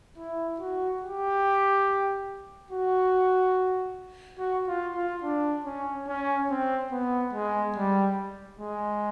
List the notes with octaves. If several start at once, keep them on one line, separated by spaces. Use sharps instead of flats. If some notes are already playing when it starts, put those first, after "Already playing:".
E4
F#4
G4
F#4
F#4
F4
F4
D4
C#4
C#4
C4
B3
G#3
G3
G#3